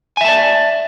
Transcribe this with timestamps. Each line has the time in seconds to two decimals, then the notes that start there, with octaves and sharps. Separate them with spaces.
0.17 G#5
0.21 E5
0.25 A5
0.28 D5